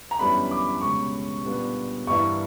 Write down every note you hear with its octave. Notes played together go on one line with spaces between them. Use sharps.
A#5
F#2 E3 G3 B3 D4 B5
D6
C#2 B2 G3 C#6
A#2 G3 B3 D4
G2 E3 A#3 E4 C#6